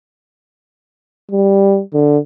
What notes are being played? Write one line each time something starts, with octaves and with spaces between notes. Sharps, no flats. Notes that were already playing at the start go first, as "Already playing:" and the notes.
G3
D3